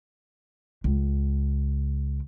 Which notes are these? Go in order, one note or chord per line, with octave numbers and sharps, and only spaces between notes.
C#2